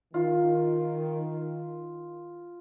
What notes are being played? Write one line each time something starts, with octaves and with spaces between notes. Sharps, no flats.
D#3 F4